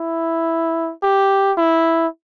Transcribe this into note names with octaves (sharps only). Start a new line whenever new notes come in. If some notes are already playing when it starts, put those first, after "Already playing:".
Already playing: E4
G4
E4